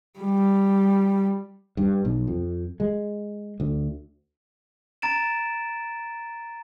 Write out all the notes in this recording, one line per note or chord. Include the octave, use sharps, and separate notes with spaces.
G3
G2
B1
F2
G#3
D2
A#5 A6 D7 E7